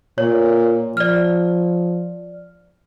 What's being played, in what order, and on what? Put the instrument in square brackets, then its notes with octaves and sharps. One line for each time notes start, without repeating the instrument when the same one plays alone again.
[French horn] A#2 [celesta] C#5
[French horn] F3 [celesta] D5 F6